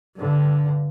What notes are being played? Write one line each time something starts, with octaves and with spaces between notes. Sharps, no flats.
G2 D3